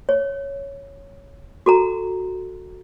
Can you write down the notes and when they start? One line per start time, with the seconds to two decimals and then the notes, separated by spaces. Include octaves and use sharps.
0.09 C#5
1.66 F#4 A4 A#5